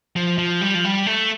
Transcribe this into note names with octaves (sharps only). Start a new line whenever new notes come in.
F3
F3
G3
F3
G3
A3